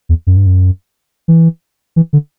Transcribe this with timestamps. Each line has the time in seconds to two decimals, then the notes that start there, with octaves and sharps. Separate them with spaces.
0.09 E2
0.27 F#2
0.37 G2
0.46 F#2
1.28 E3
1.96 E3
2.13 D3